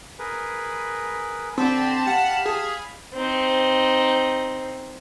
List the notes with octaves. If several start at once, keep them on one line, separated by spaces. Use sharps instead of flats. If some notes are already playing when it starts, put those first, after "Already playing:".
G#4 A#4 B4
D3 C4 G4 A5 B5
G4 F5 F#5 B5 F6
G#4
C4 D#4